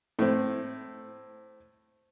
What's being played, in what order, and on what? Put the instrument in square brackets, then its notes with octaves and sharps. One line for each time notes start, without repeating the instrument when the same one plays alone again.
[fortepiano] A2 C4